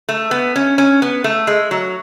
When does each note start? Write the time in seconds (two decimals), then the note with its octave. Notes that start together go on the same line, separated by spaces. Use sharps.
0.09 A3
0.31 B3
0.56 C#4
0.78 C#4
1.02 B3
1.24 A3
1.47 G#3
1.71 F#3